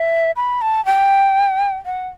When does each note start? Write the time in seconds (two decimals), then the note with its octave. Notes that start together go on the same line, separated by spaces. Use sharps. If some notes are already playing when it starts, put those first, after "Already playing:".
Already playing: E5
0.36 B5
0.61 A5
0.85 G5
1.86 F#5